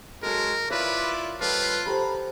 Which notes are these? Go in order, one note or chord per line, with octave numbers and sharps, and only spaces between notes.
F#3 G#3 A4 A#4 A5
E4 F4 A#4 B4 C#5 D5
G3 F4 A4 B4 C#5 D#5
G4 A4 C5 A#5 B5